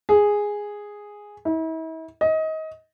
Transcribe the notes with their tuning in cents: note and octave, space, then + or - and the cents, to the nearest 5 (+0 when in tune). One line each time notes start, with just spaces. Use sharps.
G#4 -5
E4 -40
D#5 +25